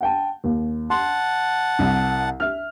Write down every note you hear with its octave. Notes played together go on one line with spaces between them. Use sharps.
F#5 G5 A5
D#2
F#5 A5 C6
C2
E5 F6